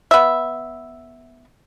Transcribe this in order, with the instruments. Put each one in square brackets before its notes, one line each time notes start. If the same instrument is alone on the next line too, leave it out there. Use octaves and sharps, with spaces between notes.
[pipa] B3 E5